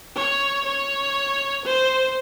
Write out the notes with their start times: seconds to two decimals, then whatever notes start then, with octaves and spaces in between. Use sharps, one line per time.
0.17 C#5
0.66 C#5
1.65 C5